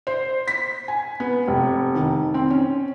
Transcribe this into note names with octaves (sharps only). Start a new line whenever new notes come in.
C5
B6
G#5
B3
F1
D#3
C4
C#4